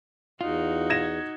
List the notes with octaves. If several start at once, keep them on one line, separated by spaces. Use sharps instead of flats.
E2 D#4 F4 F#4
G#6 A#6 E7